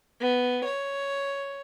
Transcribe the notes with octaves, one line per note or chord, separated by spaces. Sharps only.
B3
C#5